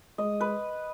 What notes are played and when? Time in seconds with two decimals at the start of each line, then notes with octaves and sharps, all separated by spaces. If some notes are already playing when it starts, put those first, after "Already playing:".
0.18 G#3 D#5
0.41 B4